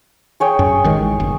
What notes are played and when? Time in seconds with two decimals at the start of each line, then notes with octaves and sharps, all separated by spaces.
0.40 G#4 C#5 G5
0.59 F#2
0.84 A1 D#3 G#3
1.20 F#1